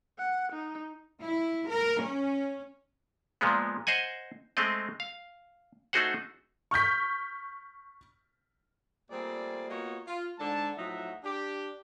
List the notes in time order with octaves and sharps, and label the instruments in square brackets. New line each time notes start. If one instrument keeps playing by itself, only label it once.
[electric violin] F#5
D#4
[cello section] E4
A#4
C#4
[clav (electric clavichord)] A#2 F3 G#3 B3
C5 D#5 F#5 G#5
G#3 A3 C4 D#5
F5
A3 D#4 F#4 G#4 C5 F#5
[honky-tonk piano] C#6 F6 G6 B6
[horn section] A#2 G3 A3 C4 G#4 D5
A#3 B3 F4 F#4 C#5 D#5
F4
G#2 D3 A5
A2 F3 F#3 D#4 E5 F#5
D4 G4